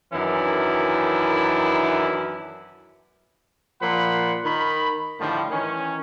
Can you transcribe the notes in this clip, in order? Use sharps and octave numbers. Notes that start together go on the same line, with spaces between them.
F#2 D#3 E3 C#4 D4 E4
A#2 F3 C5 F#5 B5
D#3 A#4 B5
A2 D3 D#3 F3 G3
D#3 E3 C#4